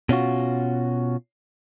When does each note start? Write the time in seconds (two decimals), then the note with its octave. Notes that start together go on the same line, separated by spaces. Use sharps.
0.09 B2 C#4 F4 F#4